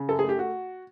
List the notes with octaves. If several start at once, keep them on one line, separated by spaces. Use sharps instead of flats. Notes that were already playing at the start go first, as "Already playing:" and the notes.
Already playing: C#3
F#2 A4
G#4
A3 G4
F#4